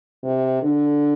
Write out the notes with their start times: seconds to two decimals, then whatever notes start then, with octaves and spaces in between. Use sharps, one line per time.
0.23 C3
0.62 D3